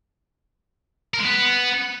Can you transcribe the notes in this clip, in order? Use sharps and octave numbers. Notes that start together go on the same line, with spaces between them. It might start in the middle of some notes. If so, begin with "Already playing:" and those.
A#4
G#3
B3